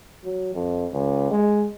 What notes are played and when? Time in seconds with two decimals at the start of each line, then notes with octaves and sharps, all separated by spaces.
0.24 F#3
0.54 F2
0.92 C#2
1.31 G#3